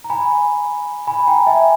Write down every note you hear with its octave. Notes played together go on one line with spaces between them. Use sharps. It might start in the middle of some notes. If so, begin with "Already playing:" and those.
A#5
G#5 B5
G#5 B5
G5 A#5
E5 G#5